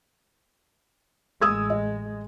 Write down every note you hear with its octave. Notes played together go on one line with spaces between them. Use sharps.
A1 G#3 D#6 E6 G#6
D#5